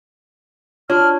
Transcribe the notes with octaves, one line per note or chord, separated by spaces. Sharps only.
D4 F4 F#4 C#5 F6